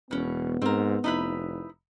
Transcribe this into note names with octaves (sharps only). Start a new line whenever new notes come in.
E1 B2 B3 C#4
G#2 C4 A#4
F1 D#4 E4 B4